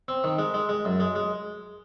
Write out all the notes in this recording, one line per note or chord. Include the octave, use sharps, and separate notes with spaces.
C4
D#3
G#3
G#3
G#3
F#2
G#3
G#3